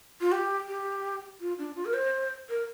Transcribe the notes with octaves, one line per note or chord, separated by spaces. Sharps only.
F4
G4
G4
F4
D4
F4
A#4
C5
A#4